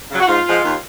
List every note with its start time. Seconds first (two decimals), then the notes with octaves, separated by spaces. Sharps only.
0.11 C#3 F#3
0.20 F#4
0.28 G#2 F4
0.46 F3 G#3
0.63 D#2